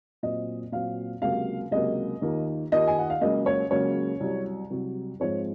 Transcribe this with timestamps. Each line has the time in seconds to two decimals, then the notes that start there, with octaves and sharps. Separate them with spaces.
0.23 A#2 F#3 C4 D#5
0.72 A#2 F#3 C4 F5
1.22 C#2 C3 F#3 A#3 F5
1.72 C#2 C3 F#3 A#3 D#5
2.22 D#2 D#3 A#3 F4
2.72 D#2 D#3 A#3 F4 D#5
2.87 G#5
2.99 F#5
3.10 F5
3.21 C#2 C#3 F#3 A#3 D#5
3.46 C#5
3.71 C#2 C#3 F#3 A#3 C#5
4.20 C2 C3 F#3
4.70 C2 C3 F#3
5.20 G#2 F3 G#3 C4 C#5